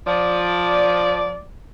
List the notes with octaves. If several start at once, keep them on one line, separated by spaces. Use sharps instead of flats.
F3 D5